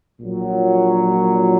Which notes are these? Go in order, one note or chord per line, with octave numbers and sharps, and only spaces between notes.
A#1 A#2 F#3